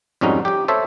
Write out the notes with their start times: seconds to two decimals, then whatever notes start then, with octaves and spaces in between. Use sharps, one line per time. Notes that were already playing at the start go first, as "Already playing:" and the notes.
0.21 F2 G#2 G3 C#4 D#4 F#4
0.45 G4 G5
0.68 A4 C5 C#5 E5